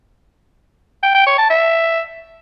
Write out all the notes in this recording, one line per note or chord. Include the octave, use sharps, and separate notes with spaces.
G5
G5
C#5
A5
E5